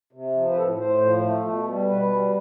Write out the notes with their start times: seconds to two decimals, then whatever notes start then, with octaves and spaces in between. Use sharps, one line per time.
0.13 C3
0.35 F3
0.49 B4
0.57 A2 A4
0.79 A2 C5
1.01 F3
1.23 A3
1.45 B2
1.66 G3
1.88 B2 B4
2.10 G3